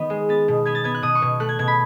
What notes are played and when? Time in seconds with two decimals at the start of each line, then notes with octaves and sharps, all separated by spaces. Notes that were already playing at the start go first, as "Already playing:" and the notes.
Already playing: D#3 B3
0.10 G#3
0.29 B3 A6
0.48 B2
0.65 B3 G#6
0.75 A6
0.84 B3 G#6
0.94 F#6
1.03 B2 D#6
1.15 C#6
1.22 B2
1.40 A3 F#6
1.49 G#6
1.59 B2 G#6
1.68 B5